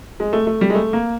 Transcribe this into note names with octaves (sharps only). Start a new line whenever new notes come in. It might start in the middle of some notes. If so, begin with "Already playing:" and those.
G#3
A3
A3
G3
G#3
A3
A#3